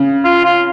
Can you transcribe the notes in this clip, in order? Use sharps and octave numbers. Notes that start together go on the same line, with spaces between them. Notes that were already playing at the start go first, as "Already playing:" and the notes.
Already playing: C#3
F4
F4